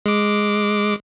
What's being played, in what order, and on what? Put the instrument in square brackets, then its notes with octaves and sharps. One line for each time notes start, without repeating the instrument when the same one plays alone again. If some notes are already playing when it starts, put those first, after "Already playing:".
[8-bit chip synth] G#3 D6